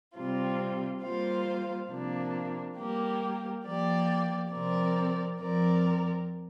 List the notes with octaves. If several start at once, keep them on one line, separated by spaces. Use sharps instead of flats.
C3 G3 C4 F4
G3 A#3 F4 C5 F5
C3 F3 A#3 D4
G3 A#3 G4 A#4
F3 A#3 G4 D5
C3 F3 C4 A#4 D5
F2 F3 C4 A#4 D5